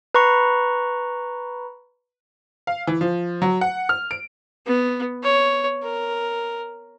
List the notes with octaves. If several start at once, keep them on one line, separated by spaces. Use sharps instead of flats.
B4 A#5 B5 C#6
F5
E3
F3
F#3
F#5
F6
D7
B3
C#5
A#4